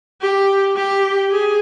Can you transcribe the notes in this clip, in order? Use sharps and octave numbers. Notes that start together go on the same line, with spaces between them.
G4
G4
G#4